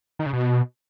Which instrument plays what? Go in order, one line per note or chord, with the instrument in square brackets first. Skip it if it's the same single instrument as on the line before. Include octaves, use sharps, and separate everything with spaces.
[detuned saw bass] D#3
C#3
B2